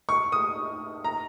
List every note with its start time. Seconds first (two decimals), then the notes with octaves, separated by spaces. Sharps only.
0.09 C#6
0.32 D#6
1.04 A#5